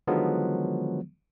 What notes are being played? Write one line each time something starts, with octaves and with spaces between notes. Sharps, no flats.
D3 D#3 F3 F#3 G#3 B3